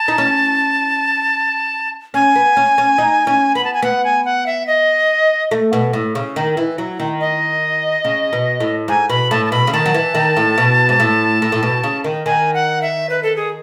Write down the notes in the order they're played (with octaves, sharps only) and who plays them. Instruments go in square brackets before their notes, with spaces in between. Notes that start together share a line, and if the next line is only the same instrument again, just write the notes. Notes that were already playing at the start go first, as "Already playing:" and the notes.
Already playing: [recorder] A5
[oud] D#4
C#4
[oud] C#4 [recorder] G#5
[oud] B3
C#4
C#4
D#4
C#4
[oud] B3 [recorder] B5
[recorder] A5
G#5
[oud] B3 [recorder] F#5
[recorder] G#5
F#5
E5
D#5
[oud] A3
B2
A2
C#3
D#3
E3
F#3
D#3
[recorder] D#5
[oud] C#3
B2
A2
[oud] G#2 [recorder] G#5
[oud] B2 [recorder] B5
[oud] A2 [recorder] A5
[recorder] A5
[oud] B2 [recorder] B5
[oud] C#3
[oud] D#3 [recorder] A5
[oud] F#3
E3
D#3
A2
B2
G#2
A2
A2
A2
B2
C#3
D#3
[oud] D#3 [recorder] G#5
[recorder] F#5
E5
B4
A4
G#4